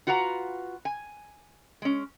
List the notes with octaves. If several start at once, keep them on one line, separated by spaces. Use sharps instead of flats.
F4 F#4 B4 F#5 A#5
G#5
G#3 C#4